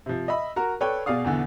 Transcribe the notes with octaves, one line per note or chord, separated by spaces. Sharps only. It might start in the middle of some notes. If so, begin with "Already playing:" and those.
C3 F3
D#5 E5 B5
F#4 A#4 A#5
A4 B4 C#5 D5 G5
B2 G#4 D5 F5 D#6
E2 B2 D3 E3